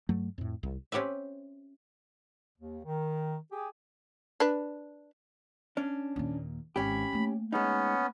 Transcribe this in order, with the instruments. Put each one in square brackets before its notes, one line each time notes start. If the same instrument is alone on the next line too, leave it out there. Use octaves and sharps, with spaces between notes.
[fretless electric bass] G2 F#3 A3
F2 A2
C2
[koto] C4 C#4 G4 B4 E5
[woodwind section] D#2
D#3
G4 G#4
[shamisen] D4 B4
[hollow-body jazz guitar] C#4 D4
[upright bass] D#2 A#2
[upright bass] G#1 [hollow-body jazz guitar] C#4 G4 [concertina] B5
[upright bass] A3 A#3
[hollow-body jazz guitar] G#3 D#4 [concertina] B3 C#4